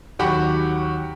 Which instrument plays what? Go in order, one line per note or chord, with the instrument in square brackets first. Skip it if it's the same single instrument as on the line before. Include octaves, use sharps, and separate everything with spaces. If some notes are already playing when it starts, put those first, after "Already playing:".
[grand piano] D#2 F#3 F#4 G4 F#5 B5